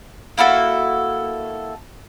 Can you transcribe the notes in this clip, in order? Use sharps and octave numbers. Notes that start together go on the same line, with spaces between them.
A#3 E4 F#4 A4